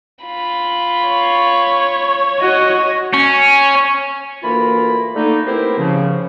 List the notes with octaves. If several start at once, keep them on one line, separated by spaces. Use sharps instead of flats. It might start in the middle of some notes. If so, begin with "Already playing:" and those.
F4 B5
C#5
F#4 D#5
C#4
D2 E3 A#3 F4 A#4 B5
D3 A3 A#3 D#4
B3 C4 E4 G4 A#4 C5
C#3 F3